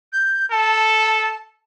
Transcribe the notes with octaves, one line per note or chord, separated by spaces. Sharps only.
G6
A4 A5